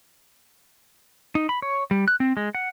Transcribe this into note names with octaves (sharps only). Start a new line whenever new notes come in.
D#4
B5
C#5
G3
F#6
C4
G#3
F#5